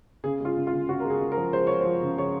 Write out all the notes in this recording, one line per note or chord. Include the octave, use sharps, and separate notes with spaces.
C#3 G#4
G#3 F4
C#3
F4
C#3
C#3 F#4
G#3 A#4
G#4
G#3
A#4
F3
G#3 C5
F3 C#5
C5
F3
C#3
G#3 C#5